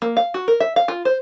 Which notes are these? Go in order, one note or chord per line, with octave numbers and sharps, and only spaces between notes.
A#3
F5
F#4
A#4
E5
F5
F4
C5